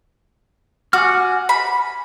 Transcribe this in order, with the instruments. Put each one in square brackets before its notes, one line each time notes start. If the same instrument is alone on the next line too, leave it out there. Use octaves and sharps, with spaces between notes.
[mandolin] F#4 [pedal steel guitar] G#5 D6 F6
[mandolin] B5